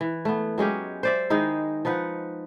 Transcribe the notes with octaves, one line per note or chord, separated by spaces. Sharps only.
E3
A3 B3
F#3 G#3 C#4 G4
C5 D5 E5
D#3 G#3 D#4 E4
F3 D#4 B4 F#5